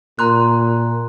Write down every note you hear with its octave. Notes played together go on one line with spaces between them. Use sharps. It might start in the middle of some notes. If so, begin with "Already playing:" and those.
A#2 A#5 C6 F#6